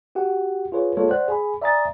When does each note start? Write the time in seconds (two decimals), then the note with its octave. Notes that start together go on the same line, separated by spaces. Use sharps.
0.15 F#4 G4 F#5
0.72 F4 G#4 B4 C#5
0.97 G#3 A#3 F4 A4 C#5
1.09 C5 D5 F#5 F#6
1.28 G#4 G#5 B5
1.61 D5 E5 G#5 A#5 D#6 A6